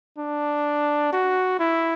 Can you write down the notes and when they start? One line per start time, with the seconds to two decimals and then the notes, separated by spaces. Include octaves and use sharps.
0.18 D4
1.13 F#4
1.59 E4